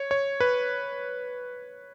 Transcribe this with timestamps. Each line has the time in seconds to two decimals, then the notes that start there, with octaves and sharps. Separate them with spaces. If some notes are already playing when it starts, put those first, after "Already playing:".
Already playing: C#5
0.11 C#5
0.40 B4